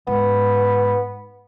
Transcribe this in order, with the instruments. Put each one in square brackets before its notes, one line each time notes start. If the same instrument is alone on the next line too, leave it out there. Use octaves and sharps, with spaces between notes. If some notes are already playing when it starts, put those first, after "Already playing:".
[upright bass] G#2 [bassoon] B3